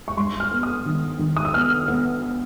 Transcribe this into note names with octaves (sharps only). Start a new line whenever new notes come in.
C#6
G2 C6
F6
B3
D#6
D#3
D#3
D#6
E6
B3 F6
B3